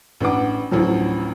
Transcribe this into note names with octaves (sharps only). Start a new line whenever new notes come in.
A1 D4 B4 F#5 D6
A1 D2 A2 F3 F#3